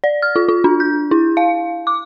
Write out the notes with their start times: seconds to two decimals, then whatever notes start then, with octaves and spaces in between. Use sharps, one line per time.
0.04 D5
0.22 F6
0.36 F4
0.48 F4
0.64 D4
0.80 G6
1.11 E4
1.37 F5
1.87 D6